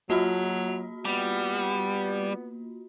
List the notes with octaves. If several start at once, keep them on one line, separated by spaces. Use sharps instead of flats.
F#3 A#3 F4 F#4
G3 B3